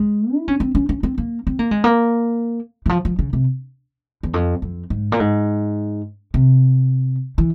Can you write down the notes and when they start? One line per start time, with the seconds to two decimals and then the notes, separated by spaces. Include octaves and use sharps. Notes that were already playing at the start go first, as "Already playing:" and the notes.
Already playing: G#3
0.35 E4
0.48 C#4
0.60 C4
0.75 C#4
0.89 C#4
1.03 C4
1.18 A#3
1.47 C4
1.59 A#3
1.71 G#3
1.84 A#3
2.86 E3
2.89 F3
3.05 F3
3.19 C#3
3.33 C3
4.23 E2
4.34 F2
4.62 F2
4.90 G#2
5.12 A#2
5.20 G#2
6.34 C3
7.38 E3